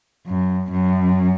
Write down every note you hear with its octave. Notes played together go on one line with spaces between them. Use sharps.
F#2
F#2